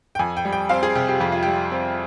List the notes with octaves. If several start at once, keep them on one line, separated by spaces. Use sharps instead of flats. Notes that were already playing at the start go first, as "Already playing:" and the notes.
G5
F2 G#5
G5
G3
G5
C4 F5
G#4
C3 G4
G4
F2 G4
F4
G3 G4
C4